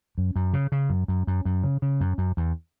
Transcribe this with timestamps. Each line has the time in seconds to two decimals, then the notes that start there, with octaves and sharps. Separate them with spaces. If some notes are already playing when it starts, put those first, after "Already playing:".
0.18 F#2
0.36 F#2
0.53 C#3
0.72 C#3
0.90 F#2
1.08 F#2
1.27 F#2
1.45 F#2
1.63 C#3
1.82 C#3
2.01 F#2
2.18 F#2
2.37 E2